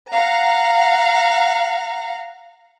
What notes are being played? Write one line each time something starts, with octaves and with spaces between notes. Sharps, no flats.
F5 F#5 A#5